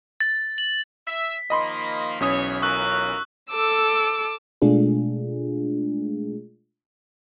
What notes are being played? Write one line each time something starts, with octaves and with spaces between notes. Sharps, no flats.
A6
F#7
E5 B6
D#3 F3 A#3 D#5 B5 C6
B1 E3 C#4 C#5 D#6
E3 F4 A#4 C#6 E6 F#6
A4 D6 E6
B2 G#3 A3 D4 F4 G#4